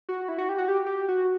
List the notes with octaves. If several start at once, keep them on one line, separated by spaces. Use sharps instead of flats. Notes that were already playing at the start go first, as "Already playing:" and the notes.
F#4
E4
F#4
G4
F#4
G4
G4
F#4